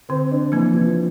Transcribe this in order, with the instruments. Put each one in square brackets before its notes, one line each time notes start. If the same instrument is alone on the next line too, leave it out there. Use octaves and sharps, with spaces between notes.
[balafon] D3 [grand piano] C4
[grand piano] D4
[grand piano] E3 [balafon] F3 A#3
[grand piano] F3